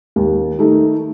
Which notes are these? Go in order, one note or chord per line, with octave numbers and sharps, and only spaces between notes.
D#2
D#3 A3 D#4